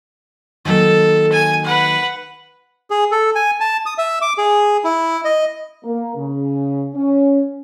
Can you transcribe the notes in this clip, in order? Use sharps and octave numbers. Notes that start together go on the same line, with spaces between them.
D#3 F#3 A#3 A4
G#5
B4 F#5
G#4
A4
G#5
A5
D#6
E5
D6
G#4
E4
D#5
A#3
C#3
C#4